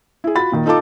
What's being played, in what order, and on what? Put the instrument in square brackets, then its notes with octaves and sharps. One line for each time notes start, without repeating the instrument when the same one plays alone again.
[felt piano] E4 G#4
F4 F#4 B5 A6
A#2 D#3
D#4 F4 A4 D#5 A5 D6